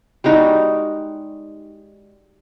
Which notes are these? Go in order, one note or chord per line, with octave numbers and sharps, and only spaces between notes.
G3 G#3 D#4 F#4